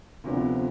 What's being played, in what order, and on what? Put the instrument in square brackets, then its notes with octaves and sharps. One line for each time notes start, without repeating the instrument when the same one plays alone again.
[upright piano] D2 C3 F3 B3